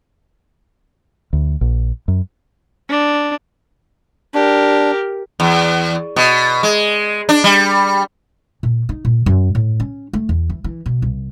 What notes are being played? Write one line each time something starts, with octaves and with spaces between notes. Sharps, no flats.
D2
A#1
F#2
D4
D4 G4 A#4
E2
B2
G#3
D4
G3
A#2
D#4
A#2
F#2
A2
C#4
A3
E2
E3
E3
B2
C2